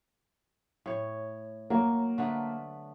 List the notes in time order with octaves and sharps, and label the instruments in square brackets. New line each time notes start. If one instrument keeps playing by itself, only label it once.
[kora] A2 C#5
[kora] F#3 [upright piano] A#3
[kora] D3 A3 B3